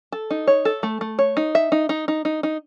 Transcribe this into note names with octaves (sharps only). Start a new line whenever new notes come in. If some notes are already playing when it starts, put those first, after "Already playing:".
A4
D#4
C#5
A4
A3
A3
C#5
D#4
E5
D#4
D#4
D#4
D#4
D#4